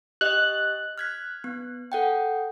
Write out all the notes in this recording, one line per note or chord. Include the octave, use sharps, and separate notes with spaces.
G4 D#5 F#6
F6 G#6 B6
B3
A4 F#5 G5